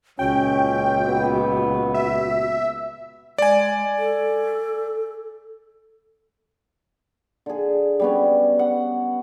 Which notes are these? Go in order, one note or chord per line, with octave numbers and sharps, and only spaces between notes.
C#2 A#2 C#4 F#4 G5
B3
E5
G#3 D5 G#5
A4
D3 G#4
G3 B3 C#4
F#5